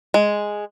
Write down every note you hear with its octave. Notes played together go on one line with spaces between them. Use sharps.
G#3